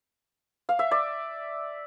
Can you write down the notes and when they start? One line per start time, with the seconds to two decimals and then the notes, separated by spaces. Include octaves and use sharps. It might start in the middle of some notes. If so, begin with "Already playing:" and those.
0.69 F5
0.79 E5
0.91 D5